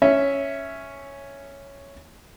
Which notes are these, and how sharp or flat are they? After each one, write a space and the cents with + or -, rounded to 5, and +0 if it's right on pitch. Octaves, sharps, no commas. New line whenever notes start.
C#4 +0 E5 +0